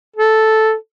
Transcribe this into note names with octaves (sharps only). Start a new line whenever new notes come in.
A4